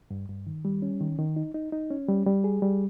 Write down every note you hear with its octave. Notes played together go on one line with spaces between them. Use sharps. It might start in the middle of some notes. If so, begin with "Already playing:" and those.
G2
G2
D#3
G3
C#4
D#3
D#3
D#4
D#4
D#4
C#4
G3
G3
G#4
G3